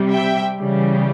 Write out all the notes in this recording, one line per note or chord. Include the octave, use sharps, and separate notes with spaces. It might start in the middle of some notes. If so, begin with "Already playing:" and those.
Already playing: C3 G3
E5 G5
C#3 E3 G3